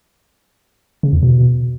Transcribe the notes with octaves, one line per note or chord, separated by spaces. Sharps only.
C#3
E2
B2